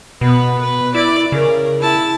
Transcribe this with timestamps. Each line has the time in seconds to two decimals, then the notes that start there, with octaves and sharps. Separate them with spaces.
0.21 B2 B3 B4
0.61 B4
0.95 E4 D5
1.32 C#3 A#4
1.80 E4 A5